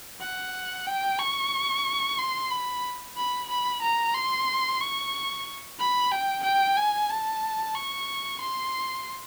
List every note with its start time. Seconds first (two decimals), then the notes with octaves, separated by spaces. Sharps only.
0.21 F#5
0.86 G5
1.19 C#6
2.18 C6
2.51 B5
3.17 B5
3.49 B5
3.82 A#5
4.14 C6
4.80 C#6
5.79 B5
6.11 G5
6.44 G5
6.77 G#5
7.10 A5
7.75 C#6
8.41 C6